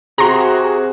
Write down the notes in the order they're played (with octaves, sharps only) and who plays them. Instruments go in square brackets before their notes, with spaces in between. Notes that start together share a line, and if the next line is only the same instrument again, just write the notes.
[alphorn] C3 [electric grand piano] F#4 G#4 [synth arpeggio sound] A#5 C6